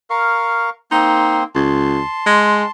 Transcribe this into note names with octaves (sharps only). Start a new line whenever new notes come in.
A#4 F5 C#6
A#3 C4 D#4 C6
C#2 A5 C6
G#3